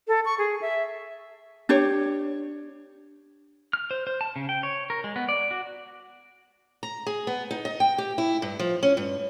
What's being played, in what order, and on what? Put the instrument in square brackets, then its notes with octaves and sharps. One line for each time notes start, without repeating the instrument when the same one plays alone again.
[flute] A4
C#6
G#4
E5
[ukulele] D4 G4 C#5
[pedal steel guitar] F6
C5
C5
A5
C#3
G5
C#5
A#4
G#3
B3
D5
F#4
[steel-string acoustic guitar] A#5
G#4
B3
D#4
D#5
G5
G4
E4
G2
F3
C#4
G2